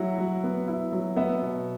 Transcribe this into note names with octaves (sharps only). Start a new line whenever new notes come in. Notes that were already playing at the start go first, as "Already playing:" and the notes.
Already playing: F#3 E4 F#5
F#3
B3
E4
F#3
B3 E5
B2